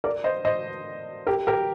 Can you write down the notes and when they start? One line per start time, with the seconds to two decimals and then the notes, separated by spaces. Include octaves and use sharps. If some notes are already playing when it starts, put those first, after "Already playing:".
0.04 A#4 D5
0.24 C5 D#5
0.45 C5 D#5
1.27 G4 A#4
1.47 G4 A#4